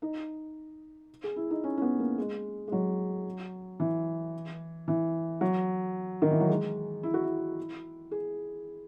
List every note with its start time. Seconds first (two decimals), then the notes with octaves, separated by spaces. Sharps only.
0.02 D#4
1.24 G#4
1.36 E4
1.50 D#4
1.64 C#4
1.77 C#4
1.82 B3
1.99 A#3
2.18 G#3
2.68 G#3
2.72 F#3
3.80 E3
4.88 E3
5.41 F#3
6.22 D#3
6.31 E3
6.40 F#3
6.49 G#3
7.03 E4
7.14 F#4
7.24 E4
8.11 G#4